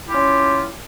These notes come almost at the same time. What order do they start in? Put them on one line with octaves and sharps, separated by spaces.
E4 G4 F4 C#4